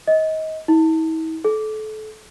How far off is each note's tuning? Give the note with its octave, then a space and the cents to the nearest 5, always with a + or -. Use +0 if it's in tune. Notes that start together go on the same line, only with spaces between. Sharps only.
D#5 +25
E4 -45
A4 -30